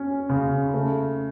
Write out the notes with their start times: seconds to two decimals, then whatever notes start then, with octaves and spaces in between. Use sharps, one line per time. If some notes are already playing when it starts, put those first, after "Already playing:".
Already playing: C#4
0.29 C#3
0.74 A3